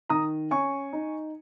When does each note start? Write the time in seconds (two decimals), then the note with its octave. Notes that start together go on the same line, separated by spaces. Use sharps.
0.09 D#3 A#5 D#6
0.51 C#4 G#5 C#6
0.93 D#4